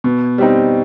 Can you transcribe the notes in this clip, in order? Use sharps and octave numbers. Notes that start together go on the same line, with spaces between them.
B2
G3 C4 D#4